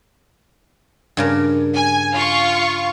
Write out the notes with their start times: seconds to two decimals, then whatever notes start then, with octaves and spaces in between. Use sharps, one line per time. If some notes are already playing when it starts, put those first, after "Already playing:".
1.17 G2 C#3 A#4
1.74 G#5
2.13 F4 F5 C#6